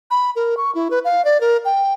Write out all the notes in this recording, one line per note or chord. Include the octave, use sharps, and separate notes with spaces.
B5
A#4
C#6
E4
B4
F5
D5
A#4
G5